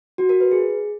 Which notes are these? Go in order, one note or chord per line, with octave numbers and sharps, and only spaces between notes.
F#4
A#4
B4
G#4